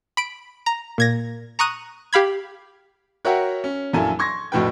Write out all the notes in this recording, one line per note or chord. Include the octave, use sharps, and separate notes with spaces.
B5 D7
A#5
A#2 G#6 A#6
A#5 C#6 D#6 F#6 D#7
G4 F5 B5 G#6
F#4 A#4 C#5 E5 F#5 G5
C#4
A#1 F#2 A#3 E4 A4 G#5
C6 C#6 G#6 A#6
A#1 F2 A2 F#4 B4 G5